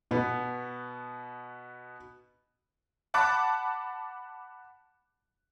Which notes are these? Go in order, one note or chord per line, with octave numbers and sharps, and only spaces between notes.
B2 B3
F#5 A5 B5 D6 F#6 A6